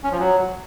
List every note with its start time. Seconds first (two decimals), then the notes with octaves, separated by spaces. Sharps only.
0.04 C#4
0.12 F3
0.20 F#3